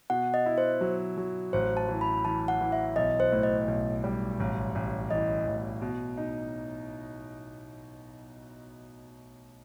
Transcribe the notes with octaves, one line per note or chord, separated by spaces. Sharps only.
B2 F#5
D#5
E4
C5
F#3
F#3
A1 C5
A5
E3
B5
E3 A5
F#5
E3
E5
B1 D#5
C5
A2
D#5
B1
G3
A1
A1
E3 D#5
A1
B2
D#4